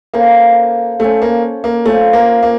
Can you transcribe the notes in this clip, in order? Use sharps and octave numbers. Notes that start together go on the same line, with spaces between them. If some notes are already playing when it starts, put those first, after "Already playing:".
A#3 C#4 A4 C5 F5
A3 C#4 A4 C5
A#3
A#3
A3 C#4 F4 C5
A#3
A#3